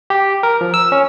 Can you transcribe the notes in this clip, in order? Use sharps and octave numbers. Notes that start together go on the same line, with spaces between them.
G4
A#4
F3
E6
C#4